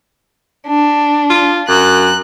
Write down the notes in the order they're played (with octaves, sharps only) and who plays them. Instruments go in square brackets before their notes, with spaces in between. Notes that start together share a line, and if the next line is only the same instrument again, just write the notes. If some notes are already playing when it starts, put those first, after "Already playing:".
[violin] D4
[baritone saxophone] F4
[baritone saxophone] F#2 [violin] F#6